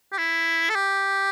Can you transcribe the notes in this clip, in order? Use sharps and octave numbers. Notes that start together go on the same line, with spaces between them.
G4
E4
A4
G4